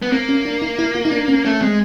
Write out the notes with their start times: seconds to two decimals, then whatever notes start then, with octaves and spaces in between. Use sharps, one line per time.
0.02 B3
0.12 A#3 C4
0.29 C#4
0.45 D4
0.62 D#4
0.79 E4
0.95 F4
1.05 D#4
1.12 D4
1.28 C#4
1.45 A3 C#4
1.61 G#3 C4